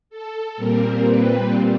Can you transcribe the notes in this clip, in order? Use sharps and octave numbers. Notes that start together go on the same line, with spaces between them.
A4
A#2 G3 C4 A#4
B4